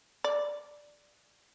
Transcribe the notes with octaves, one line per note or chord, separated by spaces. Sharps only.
D5